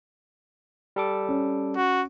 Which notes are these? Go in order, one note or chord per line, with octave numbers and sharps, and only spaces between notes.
G3 A4 D6
C#4
F#4